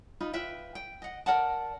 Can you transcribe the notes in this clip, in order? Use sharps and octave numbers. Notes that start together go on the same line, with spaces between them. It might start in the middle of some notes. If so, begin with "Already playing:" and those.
D#4 F4 B5
F4 B4 E5 G5
G5
D#5 F#5
A#4 D5 F#5 A5